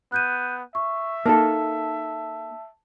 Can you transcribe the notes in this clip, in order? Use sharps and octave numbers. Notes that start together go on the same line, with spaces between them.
B3 F#6 G6 D#7
E5 C#6
A#3 D#4 A4 A5